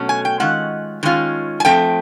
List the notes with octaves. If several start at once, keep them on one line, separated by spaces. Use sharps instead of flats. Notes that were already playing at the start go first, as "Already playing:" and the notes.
Already playing: B2 F#3 A3 C#4
G#5
G5
D#3 G#3 C#4 F4 F#5
D#3 G#3 C#4 F4
G#5
F3 A3 C4 G5